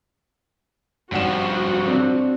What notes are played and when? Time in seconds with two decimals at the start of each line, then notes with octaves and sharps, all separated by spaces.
1.12 G#1 G2 F3 F#4 F#5 E7
1.87 C4 D4